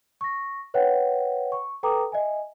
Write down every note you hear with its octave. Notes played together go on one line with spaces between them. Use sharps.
C#6 A#6
B4 C#5 E5 F#5 G5
C#6
A4 B4 G5 A#5 D6 D#6
D#5 E5 G#5